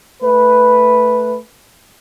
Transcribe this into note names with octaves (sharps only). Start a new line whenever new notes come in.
A3 B4